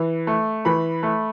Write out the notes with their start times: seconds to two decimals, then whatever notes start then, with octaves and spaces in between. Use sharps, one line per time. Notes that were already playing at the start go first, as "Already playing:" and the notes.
Already playing: E3
0.27 A3
0.65 E3 B5
1.03 A3